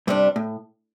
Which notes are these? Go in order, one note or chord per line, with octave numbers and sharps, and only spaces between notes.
G2 C3 G3 D4
A2